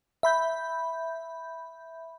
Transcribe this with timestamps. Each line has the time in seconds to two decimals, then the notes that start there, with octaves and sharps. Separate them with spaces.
0.23 E5 B5 G6